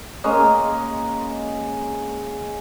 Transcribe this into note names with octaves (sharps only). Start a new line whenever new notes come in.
G#3 A#3 C#4 D#5